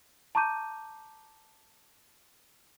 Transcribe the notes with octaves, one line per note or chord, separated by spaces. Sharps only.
A5 A#5 C#6 D6 G6 D#7